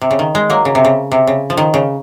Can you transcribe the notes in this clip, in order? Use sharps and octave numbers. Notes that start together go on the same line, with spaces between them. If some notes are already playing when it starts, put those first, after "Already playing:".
C3
C#3
D#3
G#3
F#3 A#3
C#3
C3
C#3
C3
C#3
F3
D#3
C#3